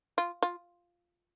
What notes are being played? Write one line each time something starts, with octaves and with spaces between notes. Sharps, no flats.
F4
F4